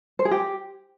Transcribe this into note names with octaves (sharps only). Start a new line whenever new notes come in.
C5
G#4
G4